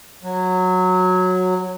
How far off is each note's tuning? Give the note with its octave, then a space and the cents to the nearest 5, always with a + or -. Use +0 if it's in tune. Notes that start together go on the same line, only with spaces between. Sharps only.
F#3 -10